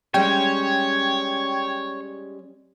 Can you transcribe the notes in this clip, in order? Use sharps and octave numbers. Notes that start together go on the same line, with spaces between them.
G3 G#3 C#4 C#5 G5 G#6